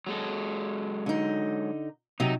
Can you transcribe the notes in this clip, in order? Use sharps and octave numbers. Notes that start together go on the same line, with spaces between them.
F#3 G#3 A4
D3 D#4
C3 F#3 D#4